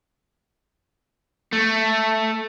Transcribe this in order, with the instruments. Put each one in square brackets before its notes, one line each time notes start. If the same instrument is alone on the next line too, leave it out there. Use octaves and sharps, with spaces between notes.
[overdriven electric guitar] A3